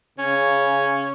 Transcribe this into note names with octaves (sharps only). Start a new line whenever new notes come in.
C#3 C#4